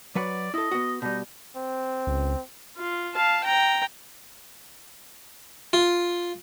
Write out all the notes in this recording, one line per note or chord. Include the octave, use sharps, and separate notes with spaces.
F#3 B4 D5 F#5
E4 A4 D#5
B3 F#4
B2 G3 D#4
C4
C#2
F4
F5 A5
G5 A#5
F4